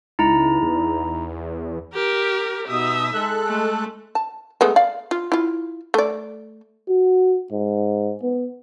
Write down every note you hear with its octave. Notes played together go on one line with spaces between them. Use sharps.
C#2 D#4 E4 A#5
E2
G4 A#4
B2 D#4 E5 D#6
G#3 A4 F#6
A3
A5
G#3 A3 B3
D5 F5
F4
E4 F4
A3 D5
F#4
G#2
B3